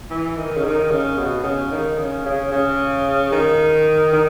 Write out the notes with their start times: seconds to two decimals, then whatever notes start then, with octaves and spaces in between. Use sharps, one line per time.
0.10 E3
0.37 D#3
0.57 C#3
0.64 D#3
0.91 C#3
1.18 B2
1.44 C#3
1.71 D#3
1.99 C#3
2.25 C#3
2.52 C#3
3.32 D#3
4.13 D#3